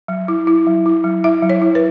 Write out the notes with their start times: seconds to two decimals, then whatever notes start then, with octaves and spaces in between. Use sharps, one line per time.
0.08 F#3
0.28 E4
0.47 E4
0.67 F#3
0.86 E4
1.04 F#3
1.24 E4 E5
1.43 F#3
1.50 C#5
1.62 E4
1.75 B4